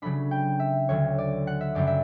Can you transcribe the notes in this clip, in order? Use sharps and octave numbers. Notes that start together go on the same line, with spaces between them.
C#3 F#3 A3 D4 B5
G5
E5
D2 D3 F#3 C#5
D5
F#5
E5
F#2 C#3 G3 D5
E5